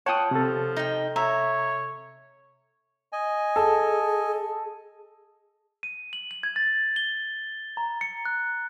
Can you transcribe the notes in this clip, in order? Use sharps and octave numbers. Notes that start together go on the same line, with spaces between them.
F4 C#5 F#5 G5 A5 D#6
C3 F3 A4
D#4 D#5 G5
C#5 E5 A#5
D#5 G#5
G#4 A4
D#7
F#7
F#7
G#6
A6
G7
A#5
C#7
F#6